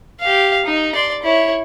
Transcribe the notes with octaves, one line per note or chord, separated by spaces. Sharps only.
G4 F5
D#4
D5 C6
E4 C#5